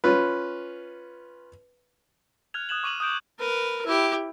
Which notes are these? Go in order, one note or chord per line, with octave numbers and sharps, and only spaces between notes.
C#4 F4 B4
F6 F#6 G#6 F7
D#6 F#6 G#6 E7 F#7
C#6 D6 D#7 F7 F#7
D#6 F6 G6 D7 E7
A#4 B4
E4 G4